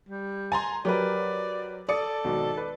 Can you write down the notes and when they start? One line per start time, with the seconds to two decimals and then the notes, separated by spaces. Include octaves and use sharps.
0.09 G3
0.52 G#5 A#5 C6 A6
0.85 F#3 G4 A#4 B4 D5
1.89 A4 D5 D#6 C#7
2.24 G#1 B2 F#3
2.57 B4